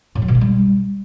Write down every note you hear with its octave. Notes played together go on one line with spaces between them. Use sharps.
A2
F#3
B2
A3
G3